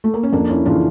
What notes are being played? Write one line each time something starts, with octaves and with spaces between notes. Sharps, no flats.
A3
A#3
C#4
F2 A#3 D4
C#4 E4
C#3 E3 D4 F4